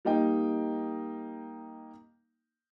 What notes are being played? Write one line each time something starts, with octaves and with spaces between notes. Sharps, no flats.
G3 A#3 D#4 D#5 G5